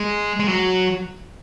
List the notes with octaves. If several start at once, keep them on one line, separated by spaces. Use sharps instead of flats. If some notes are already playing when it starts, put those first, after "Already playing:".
Already playing: G#3
G#3
F#3